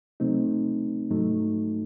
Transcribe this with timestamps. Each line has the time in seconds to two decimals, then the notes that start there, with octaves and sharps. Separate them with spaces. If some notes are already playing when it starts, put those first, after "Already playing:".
0.20 C3 F#3 A3 C4 D#4
1.10 G#2 F#3 A3 D#4